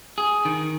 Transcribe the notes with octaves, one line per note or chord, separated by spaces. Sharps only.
G#4
D#3